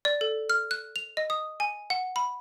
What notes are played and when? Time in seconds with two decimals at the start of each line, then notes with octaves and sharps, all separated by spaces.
0.05 D5
0.21 A4
0.50 F6
0.71 F#6
0.96 F7
1.17 D#5
1.30 D#6
1.60 G#5
1.90 F#5
2.16 B5